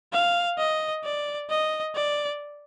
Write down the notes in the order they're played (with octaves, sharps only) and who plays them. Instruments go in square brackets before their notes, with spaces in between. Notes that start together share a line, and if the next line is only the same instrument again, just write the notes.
[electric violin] F5
D#5
D5
D#5
D5